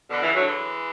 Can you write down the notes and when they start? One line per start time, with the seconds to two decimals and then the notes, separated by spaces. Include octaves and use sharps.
0.10 B2 D3
0.23 C#3 E3
0.35 D3 F#3
0.47 E3 G#3